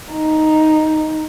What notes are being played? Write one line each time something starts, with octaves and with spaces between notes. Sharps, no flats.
D#4